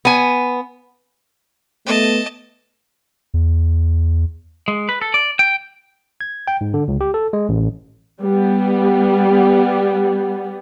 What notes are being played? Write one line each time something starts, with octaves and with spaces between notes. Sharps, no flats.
B3 G#5
A3 B3 D#5 A5
E2
G#3
B4
A4
D5
G5
G#6
G5
G#2
D3
C#2
G4
A4
G#3
A1
G3 B3